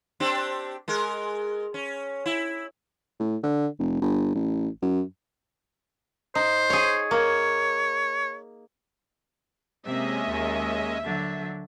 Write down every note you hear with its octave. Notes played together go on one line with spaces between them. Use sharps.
C4 D4 G4
G#3 A#4
C#4
E4
A2
D3
F1
G1
A1
F#2
D#4 C5
G#4 C#5
A#3 C#5
C3 G#3 A#3 C#4 D#5 E5
D#2
D3 F#3